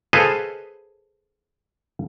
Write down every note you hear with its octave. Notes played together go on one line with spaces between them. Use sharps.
G#4 A4 B4 C5 D#5 F5